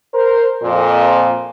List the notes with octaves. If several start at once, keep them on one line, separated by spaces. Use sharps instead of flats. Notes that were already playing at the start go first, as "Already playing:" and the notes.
A#4 C5
F2 A#2